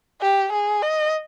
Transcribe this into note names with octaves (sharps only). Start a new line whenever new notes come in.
G4
G#4
D#5